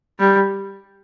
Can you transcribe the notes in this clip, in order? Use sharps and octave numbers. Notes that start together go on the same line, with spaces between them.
G3